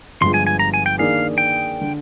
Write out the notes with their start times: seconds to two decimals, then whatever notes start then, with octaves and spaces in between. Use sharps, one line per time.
0.21 G1 G2 F3 G#3 C6
0.34 G#5
0.47 G#5
0.59 A#5
0.74 G#5
0.86 G5
0.98 D#3 A#3 D4 G#4 F5
1.38 G5
1.81 D3